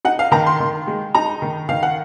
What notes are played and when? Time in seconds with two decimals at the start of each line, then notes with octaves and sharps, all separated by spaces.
0.05 D#4 F#5
0.19 F5
0.32 D#3 A#5
0.47 C6
0.60 D#3
0.87 G#3
1.15 D#4 A#5
1.42 D#3
1.69 D#3 F5
1.83 F#5